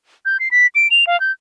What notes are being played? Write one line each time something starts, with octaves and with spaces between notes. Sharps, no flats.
G6
C7
B6
D7
F7
F5
G6